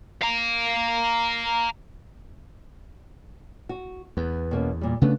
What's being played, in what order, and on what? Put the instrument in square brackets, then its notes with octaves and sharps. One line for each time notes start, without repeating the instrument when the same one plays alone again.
[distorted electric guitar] F5 A#5
[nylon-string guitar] F#4
[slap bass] E2 [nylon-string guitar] B3
[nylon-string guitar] B2 A#3 C#4
A#2 G3
[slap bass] C#3 A3 D4 [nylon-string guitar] B3